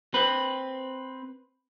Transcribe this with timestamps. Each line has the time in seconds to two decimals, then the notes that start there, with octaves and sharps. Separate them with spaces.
0.14 C4 B4